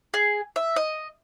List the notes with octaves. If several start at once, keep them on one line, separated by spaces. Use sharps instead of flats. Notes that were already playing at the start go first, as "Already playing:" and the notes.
G#4
E5
D#5